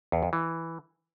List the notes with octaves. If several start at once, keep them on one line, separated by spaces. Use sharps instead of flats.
E2
F2
E3